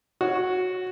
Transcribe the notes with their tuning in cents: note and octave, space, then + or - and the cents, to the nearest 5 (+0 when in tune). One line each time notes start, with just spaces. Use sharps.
F#4 -10 C#5 +0